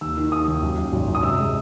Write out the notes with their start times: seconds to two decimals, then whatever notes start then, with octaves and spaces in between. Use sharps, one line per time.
0.01 D#2 E6
0.17 D#3
0.32 D#2 D#6
0.48 D#2
0.62 F#2
0.78 F#2
0.92 G#1
1.08 F#2
1.15 D#6
1.23 C3 E6
1.39 G#3